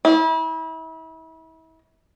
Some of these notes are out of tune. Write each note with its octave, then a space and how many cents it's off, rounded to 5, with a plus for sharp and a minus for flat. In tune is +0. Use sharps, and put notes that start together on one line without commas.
E4 -35